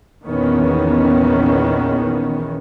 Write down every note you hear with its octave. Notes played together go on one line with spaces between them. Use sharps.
A#1 E2 D#3 B3 C#4